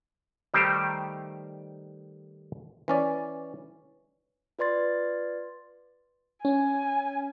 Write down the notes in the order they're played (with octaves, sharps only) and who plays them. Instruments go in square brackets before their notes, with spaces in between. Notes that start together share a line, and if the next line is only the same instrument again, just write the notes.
[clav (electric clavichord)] D#3 G3 A3 D#4 G4 C5
E3 C#4 D5
[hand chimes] F4 B4 D5 C6 A6
[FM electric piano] C#4 [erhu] G#5